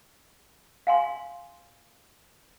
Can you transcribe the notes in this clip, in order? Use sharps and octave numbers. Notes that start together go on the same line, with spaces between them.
F5 G#5 C6